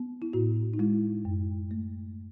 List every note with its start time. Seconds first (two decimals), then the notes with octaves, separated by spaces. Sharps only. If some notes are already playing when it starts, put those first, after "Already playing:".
Already playing: B3
0.22 E4
0.33 A2 F#4
0.74 D#4
0.79 G#3 E4
1.25 F#2
1.71 A3